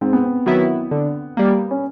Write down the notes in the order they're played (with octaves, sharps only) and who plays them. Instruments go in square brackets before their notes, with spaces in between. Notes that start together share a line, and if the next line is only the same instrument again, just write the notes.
[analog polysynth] G#2 [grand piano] C4
[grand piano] B3
C4
[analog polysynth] D#3 F#3 B3 E4
D3
G3 A#3
[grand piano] C#4